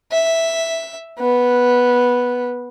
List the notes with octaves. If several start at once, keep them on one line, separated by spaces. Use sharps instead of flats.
E5
B3